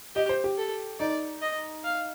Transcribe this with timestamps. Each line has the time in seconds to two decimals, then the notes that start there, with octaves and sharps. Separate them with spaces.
0.15 G4 D#5
0.29 C5
0.44 G4
0.58 A4
1.00 D#4 D5
1.42 D#5
1.84 F5